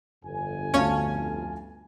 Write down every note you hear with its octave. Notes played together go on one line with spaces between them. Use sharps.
G1 F2 G#5
D2 C#4 C#5 F5 A5